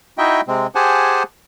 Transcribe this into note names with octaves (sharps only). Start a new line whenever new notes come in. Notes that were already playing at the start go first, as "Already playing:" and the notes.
D#4 E4 F#4 D#5 E5 G5
C3 G#3 C4
G4 G#4 C5 F#5 G#5 A5